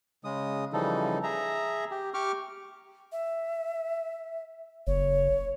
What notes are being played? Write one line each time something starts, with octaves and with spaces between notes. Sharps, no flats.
C#3 G#3 D#6
C#3 E3 F3 G3 D#4 A4
G#4 E5 A#5
G4
G4 C#6 D6 F6
E5
F#1 C#5